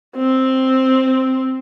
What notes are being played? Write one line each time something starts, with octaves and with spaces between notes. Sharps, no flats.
C4